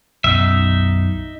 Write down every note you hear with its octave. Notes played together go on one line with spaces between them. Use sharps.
B1 F#2 D#4 E5